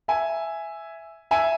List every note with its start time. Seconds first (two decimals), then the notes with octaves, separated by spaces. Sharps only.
0.08 E5 G#5
1.31 E5 G#5